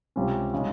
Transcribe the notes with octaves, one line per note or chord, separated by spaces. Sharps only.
C#2 C3 G3 C#4
C#3 G#3 D#4